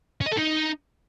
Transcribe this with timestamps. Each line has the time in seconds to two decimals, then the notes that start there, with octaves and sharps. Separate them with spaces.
0.21 C#4
0.26 D#5
0.32 A4
0.37 D#4